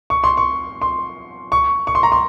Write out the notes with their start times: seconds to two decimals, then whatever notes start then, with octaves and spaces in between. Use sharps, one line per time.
0.10 C#6
0.24 C6
0.37 C#6
0.82 C6
1.52 C#6
1.87 C#6
1.95 C6
2.03 A#5
2.12 C6